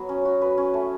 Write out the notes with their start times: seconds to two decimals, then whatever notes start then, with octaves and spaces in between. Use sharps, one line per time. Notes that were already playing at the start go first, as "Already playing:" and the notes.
Already playing: F#3 B3
0.09 C#4
0.25 F#4
0.41 B4
0.58 C#4
0.74 A3